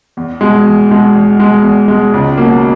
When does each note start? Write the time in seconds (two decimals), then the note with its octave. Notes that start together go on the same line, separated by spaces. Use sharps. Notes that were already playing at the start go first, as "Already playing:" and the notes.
0.17 E2
0.41 B2 G#3
0.66 E2
0.90 B2 G#3
1.15 E2
1.40 B2 G#3
1.64 E2
1.88 B2 G#3
2.14 C#2
2.38 B2 F#3 A#3